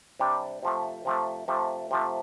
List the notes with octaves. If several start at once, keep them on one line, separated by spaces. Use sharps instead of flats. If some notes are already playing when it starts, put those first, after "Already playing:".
C3 G3 D4 G4
C3 F3 A3
C3 F3 A3
C3 F3 A3
C3 F3 A3